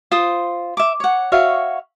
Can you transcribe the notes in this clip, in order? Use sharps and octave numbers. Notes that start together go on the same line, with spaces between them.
F4 C5 C6 D#6
E5 D6
C#5 F#5
F#4 C#5 E5 F5